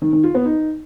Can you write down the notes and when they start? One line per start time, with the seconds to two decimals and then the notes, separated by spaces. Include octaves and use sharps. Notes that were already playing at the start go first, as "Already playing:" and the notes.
0.02 D#3
0.13 D#3
0.24 F4
0.34 B3
0.45 D#4